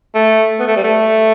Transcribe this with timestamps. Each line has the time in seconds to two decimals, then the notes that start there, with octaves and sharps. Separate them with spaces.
0.15 A3
0.59 B3
0.68 A3
0.76 G3
0.84 A3